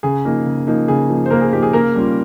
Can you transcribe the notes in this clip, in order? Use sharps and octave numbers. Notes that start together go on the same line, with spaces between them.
C#3 G#4
F3 A#3 D#4
C#3
F3 A#3 D#4
C#3 G#4
F3 A#3 D#4
C5
C#3 A#3 A#4
G#4
F3 A#3 D#4 G4
G#4
C#3 A#3 A#4
G3 C#4 F4